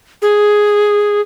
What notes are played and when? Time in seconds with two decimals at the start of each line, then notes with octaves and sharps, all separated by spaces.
0.22 G#4